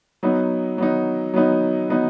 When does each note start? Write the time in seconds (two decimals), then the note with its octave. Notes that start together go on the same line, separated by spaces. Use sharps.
0.23 F#3 B3 D#4
0.78 F#3 B3 D#4
1.34 F#3 B3 D#4
1.90 F#3 B3 D#4